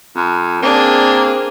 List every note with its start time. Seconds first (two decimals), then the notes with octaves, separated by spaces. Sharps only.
0.16 F2
0.62 A#3 C4 D4 G#4